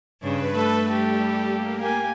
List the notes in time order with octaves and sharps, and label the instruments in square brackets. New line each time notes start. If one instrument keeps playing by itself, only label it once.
[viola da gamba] G2 C#3 [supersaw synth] B4
[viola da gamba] A3 [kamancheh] A4
[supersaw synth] G3 [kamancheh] G4 A4
[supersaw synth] A#3
[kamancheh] G4 G#5